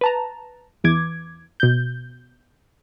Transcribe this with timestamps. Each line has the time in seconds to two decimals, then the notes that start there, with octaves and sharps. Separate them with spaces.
0.01 B4 A5 A#5
0.84 E2 E3 D6 G#6
1.60 B2 G6